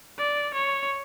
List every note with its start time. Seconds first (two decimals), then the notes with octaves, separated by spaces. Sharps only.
0.19 D5
0.54 C#5